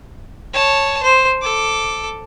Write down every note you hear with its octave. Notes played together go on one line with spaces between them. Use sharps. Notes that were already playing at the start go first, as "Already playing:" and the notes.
C#5 A5
C5
A4 D6